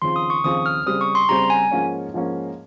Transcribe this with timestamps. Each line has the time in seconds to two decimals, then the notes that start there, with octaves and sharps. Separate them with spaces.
0.02 D#2 C#3 F3 C4 F4 C6
0.16 D#6
0.30 C#6
0.44 D#2 C#3 F3 C4 F4 D#6
0.66 F6
0.86 C#3 G3 C4 D#6
1.01 C#6
1.15 C6
1.29 C#3 G3 C4 A#5
1.50 G#5
1.71 G#2 F3 A#3 C#4
2.14 G#2 F3 A#3 C#4